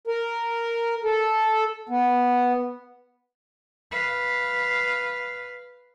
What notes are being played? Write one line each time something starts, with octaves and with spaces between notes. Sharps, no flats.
A#4
A4
B3
B4 F5